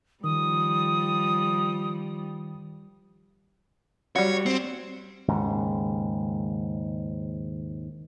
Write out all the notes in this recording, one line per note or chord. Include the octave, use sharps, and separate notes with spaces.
D#3 F3 G3 D#6
G3 F#4 C#5
C4
D#2 G#2 C#3